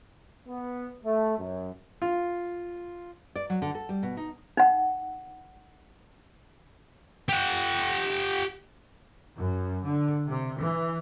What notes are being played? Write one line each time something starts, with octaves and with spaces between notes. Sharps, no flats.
B3
A3
F#2
F4
D5
F#3
D3
A4
G3
B2
D#4
D#4 F#5
G4 F#5
F#2
D3
C3
E3